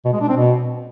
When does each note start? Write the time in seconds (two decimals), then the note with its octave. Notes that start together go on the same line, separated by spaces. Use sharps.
0.05 B2
0.13 G#3
0.21 D4
0.29 C4
0.37 B2